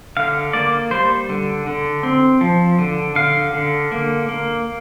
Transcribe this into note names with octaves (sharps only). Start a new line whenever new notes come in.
D3 F5
A#3 D5
G3 C5
D3
D3
C4
F3
D3
D3 F5
D3
A#3
A#3